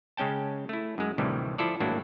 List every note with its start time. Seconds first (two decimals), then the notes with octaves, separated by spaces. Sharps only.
0.17 C#3 G#3 C#4 G5 A5
0.69 A3 E4
0.98 F#2 G#3
1.18 D2 A2 C3 D#3 E3 G3
1.58 F3 E4 F4 A4 D5
1.80 G#1 A2 F#3 A#3 D4 E4